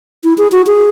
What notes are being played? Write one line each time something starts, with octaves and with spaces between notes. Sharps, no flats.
E4
G#4
F#4
G#4